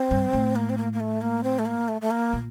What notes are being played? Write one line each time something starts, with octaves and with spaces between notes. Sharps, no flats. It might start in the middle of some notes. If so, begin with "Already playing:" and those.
Already playing: C4
G2
A2
A#3
C4
A#3
A#3
A3
A#3
C4
A3
A#3
A3
A3
A#3
A#2